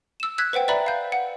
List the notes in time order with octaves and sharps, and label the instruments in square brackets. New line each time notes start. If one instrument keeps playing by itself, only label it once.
[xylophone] E6 E7
E6 F#6 G#6 B6
B4 C5 F#5 G5
B4 D5 E5 A#5 B5
F5 G6
F#5